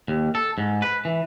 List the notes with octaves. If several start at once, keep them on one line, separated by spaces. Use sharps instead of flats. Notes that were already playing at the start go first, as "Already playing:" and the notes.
D#2
A4
G#2
B4
E3